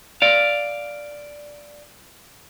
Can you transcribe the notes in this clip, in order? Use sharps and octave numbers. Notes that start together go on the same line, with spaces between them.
D5 F5